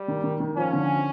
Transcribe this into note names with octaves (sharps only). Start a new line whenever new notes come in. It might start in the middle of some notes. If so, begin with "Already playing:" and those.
Already playing: G3
D#3
D#3
D#3
F3 C#4
D3